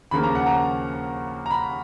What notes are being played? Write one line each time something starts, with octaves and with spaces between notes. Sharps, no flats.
D#2 C#3 F3 A#3 B5
A#5
F#5
A#5
A#5
B5